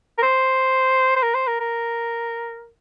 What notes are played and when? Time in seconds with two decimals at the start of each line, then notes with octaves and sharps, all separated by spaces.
0.18 A#4
0.22 C5
1.16 C5
1.23 A#4
1.35 C5
1.48 A#4
1.60 A#4